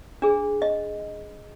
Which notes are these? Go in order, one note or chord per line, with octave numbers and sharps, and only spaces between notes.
D4 G#4
D#5